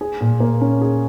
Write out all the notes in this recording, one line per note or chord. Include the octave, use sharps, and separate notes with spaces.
G#4
A#2
A#3
C#4
G#4